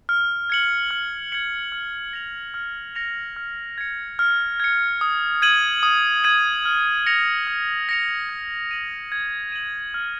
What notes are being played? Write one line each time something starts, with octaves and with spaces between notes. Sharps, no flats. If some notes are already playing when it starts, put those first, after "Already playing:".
F6
G#6 C#7 F#7
F6
G#6 C#7 F#7
F6
A#6 C#7 F7
F6
A#6 C#7 F7
F6
G#6 C#7
F6
G#6 C#7
D#6
G#6 D#7 F#7
D#6
G#6 D#7 F#7
F6
A#6 C#7 F7
F6
A#6 C#7 F7
G#6
D#7 F#7
G#6
D#7 F#7
F6